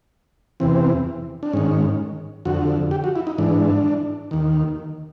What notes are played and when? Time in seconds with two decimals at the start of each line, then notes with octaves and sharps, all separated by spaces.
0.60 E2 C3 E3 C4
1.43 D4
1.53 G#2 D#3 C#4
2.45 F2 D3 F#4
2.91 G4
3.04 F#4
3.16 E4
3.27 D#4
3.38 G#2 E3 D4
4.31 D#2 D#3